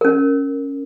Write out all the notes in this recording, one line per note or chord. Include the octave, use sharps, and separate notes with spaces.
C#4 A#4